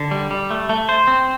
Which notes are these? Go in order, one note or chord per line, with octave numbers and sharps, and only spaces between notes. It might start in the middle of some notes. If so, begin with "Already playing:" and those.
Already playing: D3
G3
G3
A3
A3
C5
C4